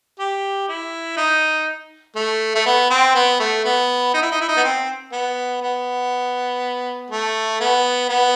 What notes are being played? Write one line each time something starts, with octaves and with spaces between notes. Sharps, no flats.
G4
E4
D#4
A3
A3
B3
C4
B3
A3
B3
D#4
E4
D#4
E4
D#4
B3
C4
B3
B3
A3
B3
B3